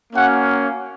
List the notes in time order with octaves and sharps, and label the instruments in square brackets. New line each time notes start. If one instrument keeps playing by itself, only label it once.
[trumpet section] A#3 C#4 F#4 F#5